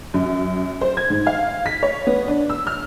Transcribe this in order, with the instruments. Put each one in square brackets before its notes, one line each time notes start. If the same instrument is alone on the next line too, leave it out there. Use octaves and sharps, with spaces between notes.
[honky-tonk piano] F#2
C5
G#6
G#2
F5
B6
C#5
B3
D4
E6
F6